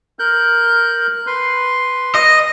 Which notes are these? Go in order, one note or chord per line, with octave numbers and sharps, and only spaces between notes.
A#4 F#6 G6
B4 C6
D#5